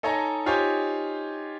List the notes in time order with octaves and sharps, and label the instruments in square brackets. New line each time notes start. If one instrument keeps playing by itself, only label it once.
[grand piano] D#4 A4 C#5 D#5 G#5 A#5
D#4 F4 G4 C5 C#5 G#5